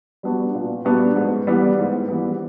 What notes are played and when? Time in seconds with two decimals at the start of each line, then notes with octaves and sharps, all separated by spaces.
0.23 G3 B3 D4 F#4
0.55 A#2
0.85 G3 B3 D4 F#4
1.16 G#2
1.47 E3 G3 B3
1.79 G#2
2.09 E3 G3 B3